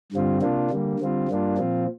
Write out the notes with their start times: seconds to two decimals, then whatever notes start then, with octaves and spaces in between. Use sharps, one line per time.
0.12 G2 D3 G3 C4 F4
0.41 C3 A#3 D4 F4
0.71 D3 G3 A#3
1.00 D3 G3 C4 F4
1.29 G2 G3 A#3 D4 F4
1.58 A#2 F3 C4 F4